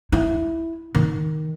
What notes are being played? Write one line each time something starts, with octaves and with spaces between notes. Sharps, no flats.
E4
D#3